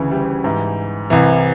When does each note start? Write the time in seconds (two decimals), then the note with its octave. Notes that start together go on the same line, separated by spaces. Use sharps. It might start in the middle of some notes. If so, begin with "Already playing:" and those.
Already playing: D2 C#3 E3
0.12 G3
0.44 G#2 E3
1.10 C2 C3 E3